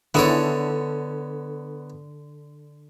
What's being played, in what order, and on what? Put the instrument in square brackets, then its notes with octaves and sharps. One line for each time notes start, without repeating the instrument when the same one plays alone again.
[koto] D3 [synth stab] D#3 E4 G#4 [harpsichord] B3 A4 C#5